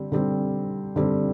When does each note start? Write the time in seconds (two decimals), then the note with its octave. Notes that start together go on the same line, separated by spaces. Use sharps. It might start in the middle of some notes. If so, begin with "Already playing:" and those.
Already playing: D3 G3 C4
0.12 D3 G3 C4
0.96 D3 G3 C4